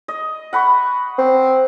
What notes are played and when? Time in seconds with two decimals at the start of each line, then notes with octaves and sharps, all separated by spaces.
0.08 D#5
0.53 F#5 B5 C#6
1.18 C4